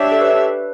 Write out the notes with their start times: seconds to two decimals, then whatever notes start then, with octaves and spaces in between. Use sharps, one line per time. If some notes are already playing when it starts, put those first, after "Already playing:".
Already playing: D4 G4 C#5 E5
0.12 A4
0.21 B4